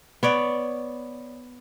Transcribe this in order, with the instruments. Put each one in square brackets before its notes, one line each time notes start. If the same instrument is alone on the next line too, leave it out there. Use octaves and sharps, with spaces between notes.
[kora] B3 C#5 D5